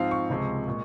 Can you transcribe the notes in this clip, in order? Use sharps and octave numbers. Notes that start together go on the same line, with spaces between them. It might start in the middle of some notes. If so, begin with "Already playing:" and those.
Already playing: G#2 F3 C4 F5
C#6
C#2 C3 F3 G#3
A#2 G#3